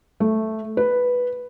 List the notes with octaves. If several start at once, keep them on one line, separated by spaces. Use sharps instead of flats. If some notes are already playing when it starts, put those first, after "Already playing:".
A3
B4